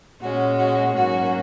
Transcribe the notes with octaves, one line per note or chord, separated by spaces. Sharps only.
A#2 G#3 C#4 F#4
F#4
G#2 F#3 A#3 C#4 F#4